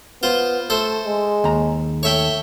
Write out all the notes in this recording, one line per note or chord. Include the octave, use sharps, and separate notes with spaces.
B3 F4 C5
A3 A4 C5
G#3
D#2 A#5
A3 C#5 E5 G5